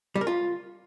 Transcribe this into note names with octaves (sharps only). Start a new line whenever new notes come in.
G3
A#4
F4